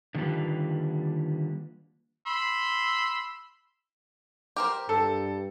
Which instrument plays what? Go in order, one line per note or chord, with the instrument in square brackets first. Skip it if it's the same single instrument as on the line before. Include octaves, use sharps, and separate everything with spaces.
[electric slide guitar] D3 D#3 G3 A#3 F4 B4
[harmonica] B5 C6 E6
[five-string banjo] G4 A#4 C5
[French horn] G2 [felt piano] A4